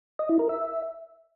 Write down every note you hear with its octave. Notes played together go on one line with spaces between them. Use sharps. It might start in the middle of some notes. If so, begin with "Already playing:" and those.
D#5
E4
A#4
E5